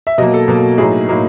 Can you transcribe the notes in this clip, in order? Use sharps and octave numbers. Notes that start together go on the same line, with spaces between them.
E5
B2 F#3 A#3 D#5
A4
B2 F#3 A#3
A2 F#3 A#3 D#4 G#4
A2 F#3 A#3 D#4